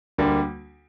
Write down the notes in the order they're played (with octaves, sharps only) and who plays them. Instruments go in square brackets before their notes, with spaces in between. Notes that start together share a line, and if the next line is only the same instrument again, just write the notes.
[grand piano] D2 D3 G3 A#3